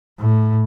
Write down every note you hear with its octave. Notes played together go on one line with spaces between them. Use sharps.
A2